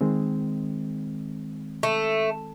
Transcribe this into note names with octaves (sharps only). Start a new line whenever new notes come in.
D#3 G#3 C4
A3